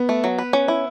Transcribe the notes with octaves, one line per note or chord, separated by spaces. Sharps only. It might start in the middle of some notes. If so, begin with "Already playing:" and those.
Already playing: B3
A3
F#3
B4
C#4
E4